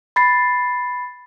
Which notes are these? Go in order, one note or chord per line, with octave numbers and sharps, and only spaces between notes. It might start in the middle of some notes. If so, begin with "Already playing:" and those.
B5 A6 C7